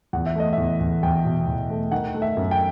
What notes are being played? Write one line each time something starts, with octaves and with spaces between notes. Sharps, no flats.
E2 F#5
E5
A3 D#5
E5
E2
E2
E2 G5
B2
E2
A3
D#3 F#5
A3
E5
F#2
G5